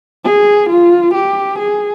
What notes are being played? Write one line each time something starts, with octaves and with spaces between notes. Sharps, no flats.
G#4
F4
G4
G#4